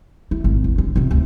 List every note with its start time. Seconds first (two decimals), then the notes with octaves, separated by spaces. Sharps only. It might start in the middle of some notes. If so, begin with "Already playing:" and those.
0.31 E4
0.44 G#1
0.64 E2
0.78 D3
0.96 A1 C3
1.11 D2 C3